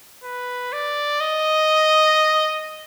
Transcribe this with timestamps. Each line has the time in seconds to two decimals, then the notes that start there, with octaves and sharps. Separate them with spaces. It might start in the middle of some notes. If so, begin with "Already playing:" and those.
0.24 B4
0.73 D5
1.21 D#5